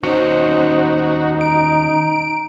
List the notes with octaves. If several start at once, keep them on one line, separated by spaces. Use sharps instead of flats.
D#2 C#4 D#4 F#4 C5
A#5 D7